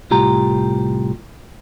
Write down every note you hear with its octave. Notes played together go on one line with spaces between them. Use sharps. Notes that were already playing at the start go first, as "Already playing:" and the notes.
C2 A2 F4 G4 A#5